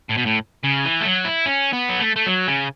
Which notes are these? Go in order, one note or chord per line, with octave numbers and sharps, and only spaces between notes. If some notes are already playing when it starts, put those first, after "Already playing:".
A2
B2
A2
C#3
E3
A3
F#3
E4
C#4
B3
F#3
A3
A3
F#3
C#3